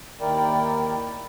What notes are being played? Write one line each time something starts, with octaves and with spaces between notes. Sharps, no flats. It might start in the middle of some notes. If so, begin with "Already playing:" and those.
D#2 D#3 E4 A#4 D5 G5